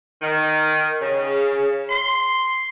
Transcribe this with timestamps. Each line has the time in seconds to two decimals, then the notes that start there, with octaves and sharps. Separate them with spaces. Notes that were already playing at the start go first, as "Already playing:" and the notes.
0.21 D#3
1.02 C#3
1.89 C6